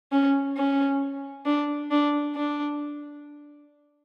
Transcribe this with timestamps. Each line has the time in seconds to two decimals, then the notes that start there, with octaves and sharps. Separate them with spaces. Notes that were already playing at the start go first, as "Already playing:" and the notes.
0.12 C#4
0.57 C#4
1.46 D4
1.91 D4
2.35 D4